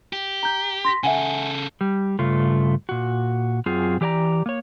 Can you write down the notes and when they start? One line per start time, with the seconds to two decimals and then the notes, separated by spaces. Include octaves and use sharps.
0.13 G4
0.43 A#5 G6
0.85 C6 A#6 B6
1.04 C#3 A4 E5 F#5 G#5
1.81 G3
2.19 G2 C#3 A3 F4
2.89 A#2 F#4
3.66 F#2 C4 F4 G#4
4.01 E3 G4 D5 G#5 A#5
4.46 A#3 C#5